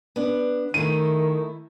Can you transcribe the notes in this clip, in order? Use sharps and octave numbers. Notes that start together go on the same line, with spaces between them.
B3 D4
D#3 A3 E4 D#7